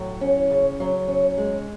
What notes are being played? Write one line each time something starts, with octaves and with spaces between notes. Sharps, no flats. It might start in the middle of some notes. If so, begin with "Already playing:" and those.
Already playing: A2 F#3
C#4
C#3
F#3
C#4
G#3